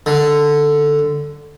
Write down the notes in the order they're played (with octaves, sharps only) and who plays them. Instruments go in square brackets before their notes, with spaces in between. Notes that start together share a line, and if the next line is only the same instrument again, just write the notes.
[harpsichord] D3